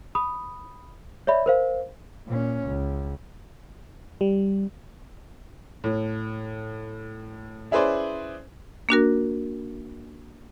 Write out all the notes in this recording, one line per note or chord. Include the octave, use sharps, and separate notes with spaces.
B5 D#6
C#5 D5 E5 B5
A#4 C5 F5
A#2 C#4
C#2
G3
A2
C#4 E4 G#4 B4 C5 D5
A#3 D4 F#4 A#4